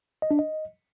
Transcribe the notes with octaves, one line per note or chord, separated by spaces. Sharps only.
D#5
D4
D#5